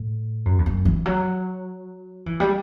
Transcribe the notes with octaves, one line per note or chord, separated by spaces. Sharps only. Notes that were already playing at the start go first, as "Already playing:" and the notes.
Already playing: A2
F#2
E2
F#2
E3
F#3
E3
G3